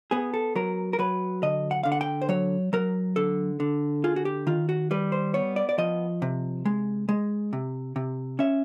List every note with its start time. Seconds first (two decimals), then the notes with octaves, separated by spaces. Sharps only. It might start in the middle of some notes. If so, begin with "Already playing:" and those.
0.11 B3 G#4
0.34 A4
0.56 F#3 A#4
0.93 A#4
0.99 F#3 B4
1.43 D3 D#5
1.71 F#5
1.83 D3 F5
1.92 F#5
2.01 G5
2.22 C5
2.29 F#3 C#5
2.73 F#3 A#4
3.16 D3 A4
3.60 D3
4.04 F4 G#4
4.16 F#4
4.25 G4
4.47 D#3 F4
4.69 F#4
4.91 G3 B4
5.12 C5
5.34 B3 C#5
5.56 D5
5.69 D5
5.78 F3 D#5
6.22 C3
6.65 G#3
7.09 G#3
7.53 C3
7.96 C3
8.39 C#4 E5